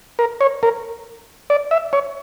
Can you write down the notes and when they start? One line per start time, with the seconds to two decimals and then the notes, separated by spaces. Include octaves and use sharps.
0.19 A#4
0.41 C#5
0.63 A#4
1.50 D5
1.71 E5
1.93 C#5